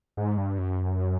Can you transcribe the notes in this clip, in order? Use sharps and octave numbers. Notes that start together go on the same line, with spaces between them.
G#2
G2
F#2